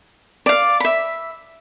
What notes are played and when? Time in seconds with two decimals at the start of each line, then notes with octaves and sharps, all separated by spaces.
0.46 D5 F5
0.80 E5 B5